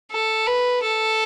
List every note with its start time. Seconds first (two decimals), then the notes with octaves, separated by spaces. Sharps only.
0.11 A4
0.47 B4
0.83 A4